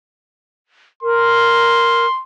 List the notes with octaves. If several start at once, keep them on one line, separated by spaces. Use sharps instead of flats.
A#4 C6